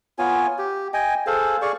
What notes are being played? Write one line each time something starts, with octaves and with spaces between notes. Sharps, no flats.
B3 F4 C#5 G#5
G4
D#5 G5 G#5
G#4 A4 C5 F5
G#4 D5 F5 C#6